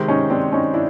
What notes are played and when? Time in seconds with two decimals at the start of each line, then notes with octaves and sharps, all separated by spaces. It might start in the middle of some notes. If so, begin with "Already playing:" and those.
Already playing: C3 D#3 G#3
0.08 C#4 D#4
0.30 C4 D4
0.52 C#4 D#4
0.74 D4 E4